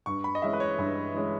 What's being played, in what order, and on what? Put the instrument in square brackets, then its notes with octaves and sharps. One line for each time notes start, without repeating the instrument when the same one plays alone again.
[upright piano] G2 [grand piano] C#6
[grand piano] B5
D#5
[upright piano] E3 G#3 C#4 [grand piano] E5
[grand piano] B4
C#5
[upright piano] G2
E3 G#3 C#4